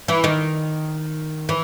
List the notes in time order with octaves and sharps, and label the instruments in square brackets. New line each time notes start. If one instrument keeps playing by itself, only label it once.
[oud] E3 E4
D#3 D#4
E3